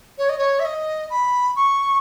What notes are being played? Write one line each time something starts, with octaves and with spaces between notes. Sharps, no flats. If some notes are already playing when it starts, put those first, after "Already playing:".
C#5
D#5
C#5
E5
D#5
B5
C#6